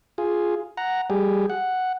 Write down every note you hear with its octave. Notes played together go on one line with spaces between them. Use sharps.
F4 G#4
F#5 A#5
G3 G4 G#4
F#5